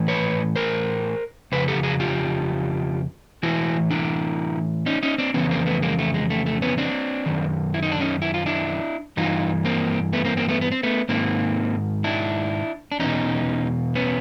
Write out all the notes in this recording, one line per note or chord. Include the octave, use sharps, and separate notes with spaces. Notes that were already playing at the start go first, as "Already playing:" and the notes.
Already playing: A2 E3
B4 C#5
A#4 C5
F2 C#3 B4
G4 A4
F#4 G#4
F4 G4
A2 E3 E4 F#4
D4 E4
C#4 D#4
C#4 D#4
C4 D4
F2 C#3 E3 B3 C#4
A#3 C4
A3 B3
G#3 A#3
A3
G#3
A3
A3
B3 C#4
C4 D4
F#2 D#3
E4
D#4
D4
C#4 D#4
E4
F4
D4 E4
G2 E3 D#4 F4
A#3 C4
A3 B3
A#3 C4
A#3 C4
A3 B3
B3
C4
A3 B3
G#2 D#3 A#3 C4
D4 E4
D4
E2 B2 C#4 D#4
B3 C#4